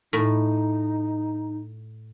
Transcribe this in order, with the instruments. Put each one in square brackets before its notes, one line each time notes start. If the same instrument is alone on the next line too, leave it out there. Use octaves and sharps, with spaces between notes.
[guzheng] A2 [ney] D#4